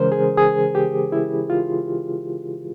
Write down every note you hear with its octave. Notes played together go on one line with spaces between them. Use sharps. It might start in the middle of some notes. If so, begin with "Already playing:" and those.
Already playing: C#3 E3 G#3 C#4 A#4 C5
G#4
G#4
G4
E4
F4